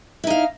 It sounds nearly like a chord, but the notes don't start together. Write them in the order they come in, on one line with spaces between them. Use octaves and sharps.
E4 D#4 F5